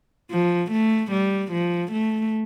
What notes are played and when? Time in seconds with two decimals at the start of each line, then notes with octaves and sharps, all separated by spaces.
0.31 F3
0.71 A3
1.11 G3
1.52 F3
1.92 A3